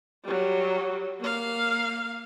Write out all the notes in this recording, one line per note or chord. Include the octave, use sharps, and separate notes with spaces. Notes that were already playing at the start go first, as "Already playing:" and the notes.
F#3 G3
A#3 F5